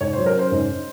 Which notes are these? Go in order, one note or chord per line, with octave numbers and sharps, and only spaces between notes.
G#2 C#5
C5
F#3
A#4
C#4 C5
G#2